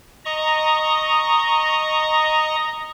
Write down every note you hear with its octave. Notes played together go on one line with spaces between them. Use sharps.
D#5 A#5 C#6 D#6